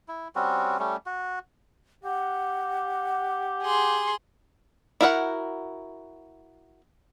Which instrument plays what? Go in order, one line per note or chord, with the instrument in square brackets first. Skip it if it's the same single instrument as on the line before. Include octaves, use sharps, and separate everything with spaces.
[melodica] E4
G3 C4 C#4 F#4
G3 A3 C#4
F#4
[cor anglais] G4 [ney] F#5
[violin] G#4 C6
[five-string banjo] E4 F#4 A#4 E5 F#5